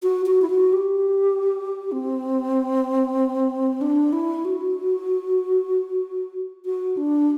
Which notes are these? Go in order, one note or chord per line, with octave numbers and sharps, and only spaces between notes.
F#4
F#4
E4
F#4
G4
C4
D4
E4
F#4
F#4
D4